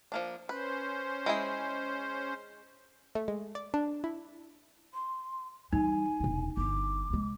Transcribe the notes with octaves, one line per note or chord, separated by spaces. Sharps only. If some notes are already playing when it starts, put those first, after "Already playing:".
F3 A#3 D4
C#4 B4 C5
G#3 E4 G#4
A3
G#3
D5
D4
E4
C6
E3 G3 D#4 G#5
E1 C3
G1 D6
C3 G#3